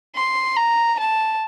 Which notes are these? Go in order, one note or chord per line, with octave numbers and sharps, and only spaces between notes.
C6
A#5
A5